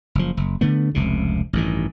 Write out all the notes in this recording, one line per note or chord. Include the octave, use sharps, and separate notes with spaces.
F#1 F3
F#1
D3 A3 B3
F1 C#2 C3
A1 G2 D#3